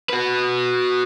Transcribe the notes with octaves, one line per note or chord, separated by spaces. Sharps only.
F#4 B4